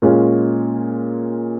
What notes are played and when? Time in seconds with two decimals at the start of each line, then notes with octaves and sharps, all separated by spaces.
0.02 A#2 G#3 C#4 F4 G#4